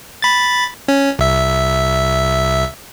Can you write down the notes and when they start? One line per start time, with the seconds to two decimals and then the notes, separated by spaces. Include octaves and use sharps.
0.22 B5 A6
0.88 C#4
1.19 C2 E5